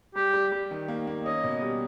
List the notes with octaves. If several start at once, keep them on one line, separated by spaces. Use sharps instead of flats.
G3 G4
G3
G3
D#3
A#3
A#3
C#4 D#5
B2
G3